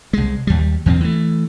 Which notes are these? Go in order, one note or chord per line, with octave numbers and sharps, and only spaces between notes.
C2 G#3
D#2 G3
E2 F3 B3 C4
E3 A3